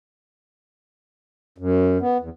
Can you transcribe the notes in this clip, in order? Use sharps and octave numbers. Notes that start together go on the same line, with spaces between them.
F#2
B3
E2